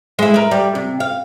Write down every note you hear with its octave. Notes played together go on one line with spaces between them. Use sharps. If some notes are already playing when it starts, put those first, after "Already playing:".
G#3 E4
A#4 B4
G3
C3
F5